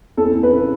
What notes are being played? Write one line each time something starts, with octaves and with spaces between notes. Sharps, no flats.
E2 A4
E2
B4
C#3